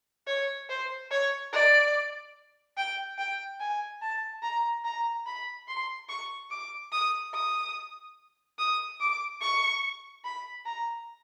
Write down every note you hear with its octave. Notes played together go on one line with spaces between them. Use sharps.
C#5
C5
C#5
D5
G5
G5
G#5
A5
A#5
A#5
B5
C6
C#6
D6
D#6
D#6
D#6
D6
C#6
B5
A#5